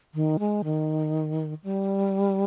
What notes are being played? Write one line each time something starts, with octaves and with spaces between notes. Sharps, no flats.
D#3
G#3
D#3
G3